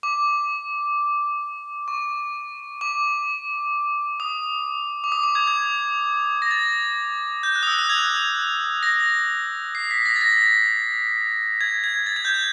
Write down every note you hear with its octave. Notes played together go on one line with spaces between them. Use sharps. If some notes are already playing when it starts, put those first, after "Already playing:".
D6
C#6
D6
D#6
D6
D#6
D6
G#6
G#6
A#6
A6
G6
F#6
D#6
E6
F#6
G#6
A#6
C7
B6
A#6
A6
A#6
G#6
G#6
A6
G#6
G6
G#6